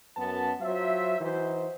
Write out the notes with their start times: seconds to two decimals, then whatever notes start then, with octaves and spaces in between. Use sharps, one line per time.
0.17 F#2 B3 A5
0.61 F#3 F4 C5 E5
1.21 E3 D#4 F#4 C5